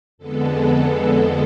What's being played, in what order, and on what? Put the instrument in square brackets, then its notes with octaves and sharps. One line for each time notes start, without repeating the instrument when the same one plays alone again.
[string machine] F2 D3 G#3 B3 A4